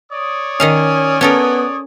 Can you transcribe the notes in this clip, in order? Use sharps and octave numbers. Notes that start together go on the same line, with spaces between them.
C#5 D5 D#6
D#3 C#4 D#5 F5
B3 C#4 A4 A#4